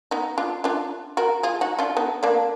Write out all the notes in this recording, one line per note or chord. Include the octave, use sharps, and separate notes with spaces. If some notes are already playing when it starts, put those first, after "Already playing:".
B3 D#4
D4 F4
D4 F4
F#4 A#4
F4 G#4
D#4 F#4
D4 F4
B3 D#4
A#3 D4